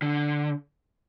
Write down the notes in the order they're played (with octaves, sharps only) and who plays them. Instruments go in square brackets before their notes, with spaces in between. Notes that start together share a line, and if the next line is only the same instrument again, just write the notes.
[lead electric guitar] D3